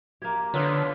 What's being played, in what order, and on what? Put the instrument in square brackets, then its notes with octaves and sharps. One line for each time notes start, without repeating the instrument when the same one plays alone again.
[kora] A#3 G4 [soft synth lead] G#6
[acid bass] D3 [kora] B3 A4 B4 [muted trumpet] F4 [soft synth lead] C#5